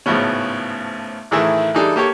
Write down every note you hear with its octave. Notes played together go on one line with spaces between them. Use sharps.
G#1 A2 C#3 F3 B3 C#4
A1 D#3 E3 A3 G#4 E5
E3 G3 D4 D#4 G#4 A4
A#3 G4 A4 C#5